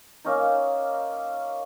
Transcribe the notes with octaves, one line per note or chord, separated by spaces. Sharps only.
A#3 C#4 D#4